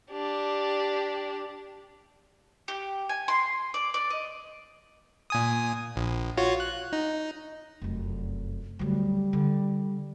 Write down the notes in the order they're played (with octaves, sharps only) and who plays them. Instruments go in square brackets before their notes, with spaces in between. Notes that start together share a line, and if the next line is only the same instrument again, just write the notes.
[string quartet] D4 G4
[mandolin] G4
G#5
C6
D5
D5
D#5
[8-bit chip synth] A#2 G#5 D#6
A#1
F4 F#4 C#5
F#6
D#4
[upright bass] F1 F#2
[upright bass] D2 F#3 [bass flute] G3
[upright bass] D3